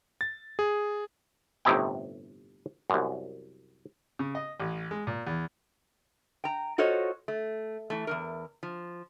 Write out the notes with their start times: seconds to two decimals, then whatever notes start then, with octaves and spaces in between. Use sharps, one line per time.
0.21 A6
0.59 G#4
1.65 G1 A2 C3 D#4 E4 G5
2.90 C2 F#2
4.19 C#3
4.35 D#5
4.60 A1
4.91 G#3
5.07 A#2
5.27 E2
6.44 G5 A#5
6.78 F4 F#4 A4 C5 C#5 D#5
7.28 A3
7.90 E3 A3
8.07 E2 G2 A#4
8.63 F3